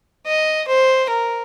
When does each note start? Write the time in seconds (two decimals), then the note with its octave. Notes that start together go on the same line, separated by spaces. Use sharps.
0.26 D#5
0.68 C5
1.09 A#4